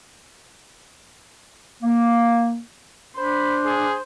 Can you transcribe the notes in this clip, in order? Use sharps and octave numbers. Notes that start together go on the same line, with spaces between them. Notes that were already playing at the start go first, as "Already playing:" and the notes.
A#3
D4 C5 B5
G#4